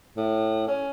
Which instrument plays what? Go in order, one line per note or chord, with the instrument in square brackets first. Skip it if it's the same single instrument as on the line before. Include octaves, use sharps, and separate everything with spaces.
[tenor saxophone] A2
C#4